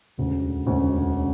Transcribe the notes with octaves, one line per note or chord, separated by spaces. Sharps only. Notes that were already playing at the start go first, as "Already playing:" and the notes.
E1 D2 C#3
E1 D2 C#3
C#3